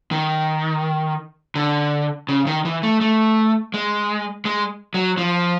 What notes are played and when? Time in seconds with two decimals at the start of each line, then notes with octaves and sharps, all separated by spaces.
0.11 D#3
1.55 D3
2.29 C#3
2.47 D#3
2.65 E3
2.83 A3
3.01 A3
3.74 G#3
4.45 G#3
4.94 F#3
5.18 F3